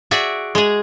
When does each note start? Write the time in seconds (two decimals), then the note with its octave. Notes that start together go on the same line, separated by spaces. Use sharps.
0.11 F#4 G#4 D5 E5
0.55 G#3 G#4